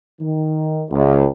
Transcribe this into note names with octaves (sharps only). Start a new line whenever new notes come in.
D#3
C#2